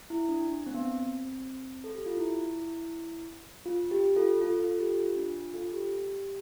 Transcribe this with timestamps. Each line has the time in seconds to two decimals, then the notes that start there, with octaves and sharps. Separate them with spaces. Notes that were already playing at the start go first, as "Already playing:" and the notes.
0.10 E4
0.29 D4
0.47 D4
0.66 C4
0.74 B3
0.83 C4
1.84 A4
1.95 G4
2.06 F4
2.17 E4
3.66 F4
3.91 G4
4.16 F4 A4
4.41 F4 A4
4.60 F4 A4
4.79 G4
4.97 F4
5.16 D4
5.34 F4
5.54 F4 A4
5.73 G4